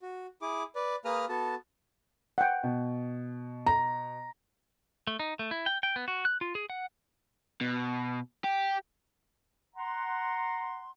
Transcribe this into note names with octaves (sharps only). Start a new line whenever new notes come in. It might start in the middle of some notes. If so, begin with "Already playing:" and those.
F#4
E4 G#4 D6
B4 D5
A#3 G#4 B4 A#5 D#6 F6
B3 F#4 A4 A5
F#5 G5
B2
A#5
A3
D#4
A3
E4
G5
G5
B3
F#4
F#6
F4
G#4
F#5
B2
G4
F#5 A#5 C6